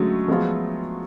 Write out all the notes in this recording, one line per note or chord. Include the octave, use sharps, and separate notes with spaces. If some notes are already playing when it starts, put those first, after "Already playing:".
Already playing: D3 F#3 G#3 A3 C#4
F3 G#3 B3 F4